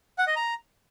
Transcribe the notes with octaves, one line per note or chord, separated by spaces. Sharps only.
F#5
D#5
A#5